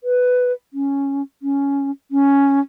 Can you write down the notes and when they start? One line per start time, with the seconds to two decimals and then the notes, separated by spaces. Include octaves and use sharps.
0.04 B4
0.73 C#4
1.42 C#4
2.11 C#4